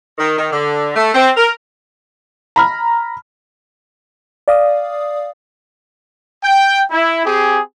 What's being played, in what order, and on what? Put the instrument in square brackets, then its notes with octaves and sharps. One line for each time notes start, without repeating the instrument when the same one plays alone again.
[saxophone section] D#3
D#3
D3
A3
C4
A#4
[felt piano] A#5 B5 F6
[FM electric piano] D5 F5 D#6
[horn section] G5
E4
C4 G4 G#4